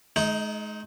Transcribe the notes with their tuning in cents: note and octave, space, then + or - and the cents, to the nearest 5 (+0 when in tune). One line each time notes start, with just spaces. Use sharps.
G#3 +40 D#4 +0